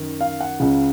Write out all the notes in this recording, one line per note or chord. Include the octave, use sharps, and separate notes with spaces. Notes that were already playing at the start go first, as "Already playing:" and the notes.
Already playing: F#2 D#3
F5
F#5
C#2 C#3